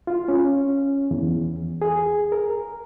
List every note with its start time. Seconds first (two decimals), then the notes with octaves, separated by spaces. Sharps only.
0.07 F4
0.28 C#4
1.11 E2
1.82 G#4
2.32 A#4